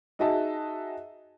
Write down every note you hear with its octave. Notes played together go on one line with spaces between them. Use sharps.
D#4 F#4 G#4 D#5 E5 A5